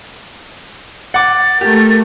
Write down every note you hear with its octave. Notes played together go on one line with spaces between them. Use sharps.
F#5 D6 A6
A3 G4 A#4